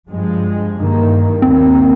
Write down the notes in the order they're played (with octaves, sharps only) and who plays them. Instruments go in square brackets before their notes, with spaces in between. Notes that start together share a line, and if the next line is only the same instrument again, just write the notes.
[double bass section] G2 F3 G#3
G2 D#3 A#3
[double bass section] D#2 D#3 A#3 [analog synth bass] C4